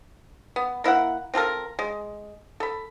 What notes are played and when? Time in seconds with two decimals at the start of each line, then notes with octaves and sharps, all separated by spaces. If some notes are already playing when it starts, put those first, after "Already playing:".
0.56 B3
0.84 A#3 E4 E5 F#5
1.34 C4 F4 A4 A#4
1.79 G#3
2.60 A4 B5